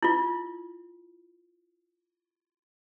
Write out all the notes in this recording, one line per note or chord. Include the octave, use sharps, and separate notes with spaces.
E4 F4